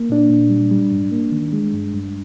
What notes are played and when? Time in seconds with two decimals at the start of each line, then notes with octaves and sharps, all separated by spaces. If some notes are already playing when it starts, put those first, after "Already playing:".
Already playing: A#3
0.09 A#2 D4
0.30 A#2
0.50 G3
0.71 G3
0.91 G#2
1.12 A#3
1.32 D#3
1.53 G#3
1.73 G2
1.94 G2